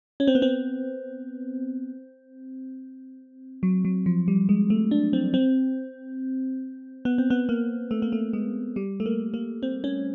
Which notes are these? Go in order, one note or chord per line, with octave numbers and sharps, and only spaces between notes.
C#4
C4
B3
C4
F#3
F#3
F3
G3
G#3
A3
D4
C4
C4
B3
C4
B3
A#3
A3
A#3
A3
G#3
G3
A3
A#3
A#3
C4
C#4